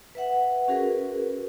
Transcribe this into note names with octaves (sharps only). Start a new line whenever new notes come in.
B4 E5 F#5
C#4 F#4 G#4 A#4 B4